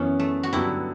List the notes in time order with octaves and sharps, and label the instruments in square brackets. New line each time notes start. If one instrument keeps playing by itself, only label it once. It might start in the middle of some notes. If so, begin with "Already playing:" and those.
Already playing: [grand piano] F#2 E3 B3 [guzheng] C#4
[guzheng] A3
F#4
[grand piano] G2 D3 F#3 B3 D4 [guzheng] E4 G4